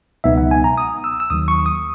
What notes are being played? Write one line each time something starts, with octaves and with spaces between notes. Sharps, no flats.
C#2 B2 F#3 B3 D#4 E5
F#5
G#5
A#5
D#6
E6
E6
D#2 D#3 F#3 D#6
C#6
D#6